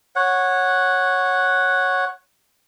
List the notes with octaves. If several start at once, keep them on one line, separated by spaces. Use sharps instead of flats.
C#5 F#5